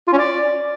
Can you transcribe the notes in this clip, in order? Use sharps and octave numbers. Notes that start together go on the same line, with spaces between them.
F4
C#4
D5